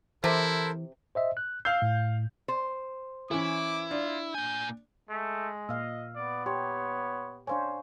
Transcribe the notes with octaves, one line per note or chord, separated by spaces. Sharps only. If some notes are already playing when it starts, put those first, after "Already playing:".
C3 E3 E4 A4 A#4 C5
C5 D#5 E5
F#6
F5 E6 G6 C7
A2
C5
E3 C#4 E4 D6
D4 F4
A#2 G#5 G6
G#3 A3
A#2 D#5 F5 E6
B3 D5
G4 C#5 C6
C#4 D4 C5 C#5 F5 G#5